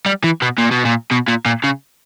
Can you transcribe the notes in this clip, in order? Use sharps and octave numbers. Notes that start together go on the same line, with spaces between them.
G3
E3
B2
A#2
B2
A#2
B2
A#2
A#2
C#3